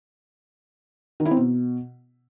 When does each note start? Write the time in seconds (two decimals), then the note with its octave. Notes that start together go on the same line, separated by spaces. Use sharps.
1.20 D#3
1.25 E4
1.31 C4
1.37 B2